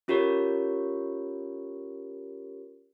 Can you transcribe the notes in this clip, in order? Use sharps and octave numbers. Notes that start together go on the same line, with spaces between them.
C#4 F4 G4 A#4 C#5